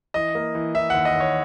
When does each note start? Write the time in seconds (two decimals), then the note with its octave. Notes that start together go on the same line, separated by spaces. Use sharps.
0.14 E3 D#5
0.35 A#3
0.55 E3
0.75 E3 E5
0.90 D#2 F#5
1.05 D#5
1.16 D#2 C#5